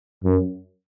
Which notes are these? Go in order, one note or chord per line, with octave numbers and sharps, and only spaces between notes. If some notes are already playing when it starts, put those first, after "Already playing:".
F#2